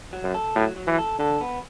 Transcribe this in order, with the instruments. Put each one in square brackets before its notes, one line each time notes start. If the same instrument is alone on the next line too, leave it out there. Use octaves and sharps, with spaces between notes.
[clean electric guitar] F#3
[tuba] F#2
[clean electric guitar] A4
[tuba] A2 [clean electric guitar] F#3
[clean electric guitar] F#3
[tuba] E3
[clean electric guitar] A4
[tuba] D3 [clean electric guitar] A4
[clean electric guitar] B3